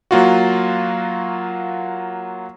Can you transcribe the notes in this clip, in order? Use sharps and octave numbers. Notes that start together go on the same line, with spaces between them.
F#3 A#3 F4 F#4